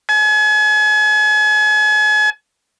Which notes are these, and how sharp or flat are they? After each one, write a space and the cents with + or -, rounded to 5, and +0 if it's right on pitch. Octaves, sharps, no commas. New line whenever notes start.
G#5 +40